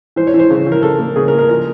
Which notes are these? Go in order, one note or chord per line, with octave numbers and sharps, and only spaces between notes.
E3 C5
C#5
E3
C5
C#3
E3
A#4
C#3 A4
A#3
C#3 G#4
A#4
A#3
A#4
F3 A#4